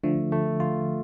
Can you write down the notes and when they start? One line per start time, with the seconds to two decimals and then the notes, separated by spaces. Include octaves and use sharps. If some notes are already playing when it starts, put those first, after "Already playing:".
0.03 D3 F3 A3
0.32 A3
0.60 F4